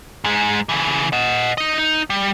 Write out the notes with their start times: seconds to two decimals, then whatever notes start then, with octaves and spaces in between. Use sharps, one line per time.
0.24 G#2 G#3
0.69 C#3 E3
1.13 D#5 F#5
1.58 D#4 D#5
1.78 D#4
2.10 G3